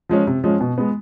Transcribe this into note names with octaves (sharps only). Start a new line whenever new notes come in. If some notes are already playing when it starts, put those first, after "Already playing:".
F3 G#3 C#4
C3
F3 G#3 C#4
B2
G#3 B3